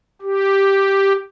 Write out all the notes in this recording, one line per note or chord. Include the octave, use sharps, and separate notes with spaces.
G4